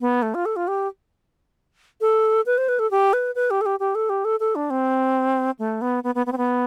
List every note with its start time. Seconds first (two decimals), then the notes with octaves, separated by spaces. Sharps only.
0.01 B3
0.22 A3
0.34 F4
0.45 A4
0.56 F4
0.68 G4
2.01 A4
2.46 B4
2.58 C5
2.68 B4
2.79 A4
2.91 G4
3.13 B4
3.35 B4
3.50 G4
3.61 A4
3.66 G4
3.80 G4
3.95 A4
4.09 G4
4.25 A4
4.40 A4
4.55 D4
4.70 C4
5.59 A3
5.81 B3
6.04 B3
6.15 B3
6.26 B3
6.32 C4
6.37 B3